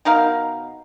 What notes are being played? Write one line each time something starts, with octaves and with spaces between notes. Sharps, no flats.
B2 D#4 A#4 F5